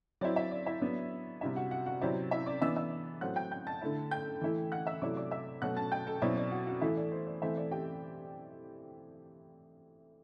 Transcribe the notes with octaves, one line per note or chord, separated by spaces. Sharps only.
F#3 C4 E4 D5
E4 E5
D5
E4 E5
F#3 B3 D4
C3 G3 D4 E4 E5
F#4 F#5
F#4 F#5
F#4 F#5
C3 F#3 C4 E4 D5
E4 E5
D5 D6
E3 B3 D4 E5 E6
E5 E6
A2 F#3 C4 F#5 F#6
G5 G6
G5 G6
A5 A6
D3 A3 E4
G5 G6
E3 A3 E4
F#5 F#6
E5 E6
C3 F#3 A3 E4 D5 D6
D5 D6
E5 E6
B2 F#3 A3 F#5 F#6
A5 A6
G5 G6
A4 A5
B2 F#3 C4 E4 D5
D5
F#4 F#5
F#4 F#5
A2 E3 A3 E4 E5
D5
C5
D5
E3 A3 C4 E4 E5
D5
G4 G5